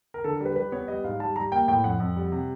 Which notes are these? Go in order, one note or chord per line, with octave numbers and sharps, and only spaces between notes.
A#4
D3 A4
A#4
G3
B4
G3 B4
B3 C#5
G3 D#5
G#2 F5
G3 A5
G3 A#5
A#3 G5
A2 G5
F2 F#5
F2
G3
C3